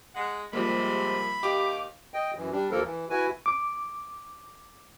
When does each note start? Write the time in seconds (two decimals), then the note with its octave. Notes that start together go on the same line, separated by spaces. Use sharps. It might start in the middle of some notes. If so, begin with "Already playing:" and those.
0.15 G#3 F#5
0.53 C3 F3 G3 G#3 A#3 C5 E5 B5
1.43 D#2 G4 D#5 F5 D6
2.14 D#5 G5
2.36 F#2 E3
2.52 G3 D4
2.71 D#2 F3 A#3 A4 A#4
2.84 E3
3.10 E4 F#4 B4 G#5
3.46 D6